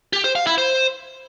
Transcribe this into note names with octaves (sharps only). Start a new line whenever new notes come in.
G4
C5
F5
E4
C5